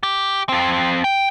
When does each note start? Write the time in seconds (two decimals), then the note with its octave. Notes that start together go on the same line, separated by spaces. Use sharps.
0.03 G4
0.49 F2 C4
1.04 G5